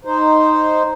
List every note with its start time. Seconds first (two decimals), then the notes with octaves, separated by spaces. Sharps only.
0.05 D#4 C5